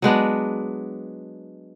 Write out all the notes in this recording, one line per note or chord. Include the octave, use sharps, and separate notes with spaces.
F#3 G#3 B3 D4